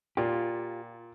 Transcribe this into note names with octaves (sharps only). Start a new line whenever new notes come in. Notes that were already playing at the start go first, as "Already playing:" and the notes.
A#2 F4 G4